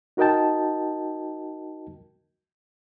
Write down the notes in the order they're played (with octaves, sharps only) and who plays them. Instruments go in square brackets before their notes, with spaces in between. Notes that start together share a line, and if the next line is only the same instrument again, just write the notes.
[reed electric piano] D#4 F#4 A#4 D#5 G5 A5